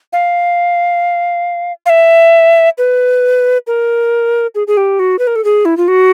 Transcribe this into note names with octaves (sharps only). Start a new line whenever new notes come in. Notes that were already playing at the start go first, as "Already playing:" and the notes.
F5
F5
E5
B4
A#4
G#4
G#4
G4
F#4
B4
A#4
A4
G#4
E4
F4
F#4